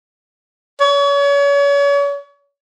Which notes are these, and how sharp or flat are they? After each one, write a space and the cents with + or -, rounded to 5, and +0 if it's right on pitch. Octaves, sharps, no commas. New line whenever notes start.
C#5 +35